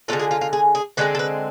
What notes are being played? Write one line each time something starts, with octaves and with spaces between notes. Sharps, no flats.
D3 G#3 D4 F4 A4
G#4
F4
F4
G#4
G#4
D3 G#3 C4 B4
A4
B4